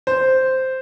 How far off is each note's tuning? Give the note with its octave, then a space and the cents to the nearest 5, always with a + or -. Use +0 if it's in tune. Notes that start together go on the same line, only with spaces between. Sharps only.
C5 -5